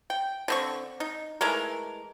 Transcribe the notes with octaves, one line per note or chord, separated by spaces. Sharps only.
G5
D3 C4 C#6
D#4
E3 G#3 A3 A#4